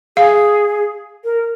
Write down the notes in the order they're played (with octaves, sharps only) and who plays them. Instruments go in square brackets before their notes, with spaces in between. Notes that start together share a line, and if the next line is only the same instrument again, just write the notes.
[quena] G#4 [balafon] F5
[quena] A#4